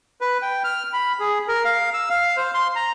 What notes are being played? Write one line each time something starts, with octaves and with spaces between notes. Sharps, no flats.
B4
G5
F6
B5
G#4
A#4
F5
E6
F5
C5
C6
A#5